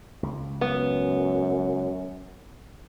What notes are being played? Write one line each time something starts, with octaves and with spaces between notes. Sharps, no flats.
C#2
F#2 B3